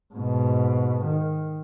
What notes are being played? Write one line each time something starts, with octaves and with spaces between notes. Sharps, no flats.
G#2 B2
D#3